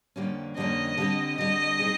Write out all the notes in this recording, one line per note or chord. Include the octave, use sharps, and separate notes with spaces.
F2 D3 G3 A#3 C#4
F2 D3 G3 A#3 C#4 D#5
D3 G3 C4
D3 G3 C4 D#5
G3 C4 D#4 G#4